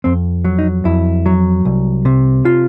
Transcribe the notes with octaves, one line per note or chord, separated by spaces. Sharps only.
F2 C4
F#3
D#4
F2 E4
F#3
C2
C3
F4